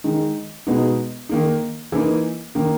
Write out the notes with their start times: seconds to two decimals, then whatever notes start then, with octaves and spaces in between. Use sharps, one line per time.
0.04 D#3 G#3 D#4
0.67 B2 G#3 B3 D#4
1.29 D#3 A#3 D#4
1.92 E3 A#3 D#4
2.55 D#3 A#3 D#4